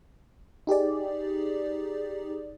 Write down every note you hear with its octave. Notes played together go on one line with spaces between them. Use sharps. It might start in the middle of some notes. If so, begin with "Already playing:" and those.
D#4 G4 G#4 D5